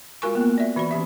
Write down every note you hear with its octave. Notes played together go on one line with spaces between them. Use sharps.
G#3 F4 F#4 A#4 G#5 C#6
A#3 B3
D5 E5
E3 F#4 D5 B5
E3 C#4 G4 E5